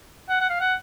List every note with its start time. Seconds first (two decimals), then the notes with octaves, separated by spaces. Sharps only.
0.29 F#5
0.41 F#5
0.50 F5
0.60 F#5